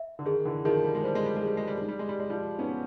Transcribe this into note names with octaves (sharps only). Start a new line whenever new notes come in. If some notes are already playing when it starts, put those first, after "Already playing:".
Already playing: E5
D3
D#3 G#4
D3 E3
D#3 F3 G#4
G3
G#3
G3 C5
G#3
G3
G#3
G3 G#4
G#3
G3
G#3 D#4
G3
G#3
G3
G#3 D5
F3 G3
B3 C#4 D#4